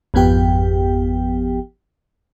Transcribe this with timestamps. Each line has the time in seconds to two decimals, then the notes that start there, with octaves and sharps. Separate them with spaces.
0.14 G#1 F2 F3 B3 G4 G5